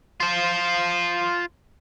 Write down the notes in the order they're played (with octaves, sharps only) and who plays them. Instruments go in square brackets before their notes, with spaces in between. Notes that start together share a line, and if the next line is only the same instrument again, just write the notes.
[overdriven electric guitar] F4 C5